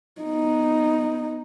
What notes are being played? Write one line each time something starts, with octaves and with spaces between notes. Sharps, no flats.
B3 D#4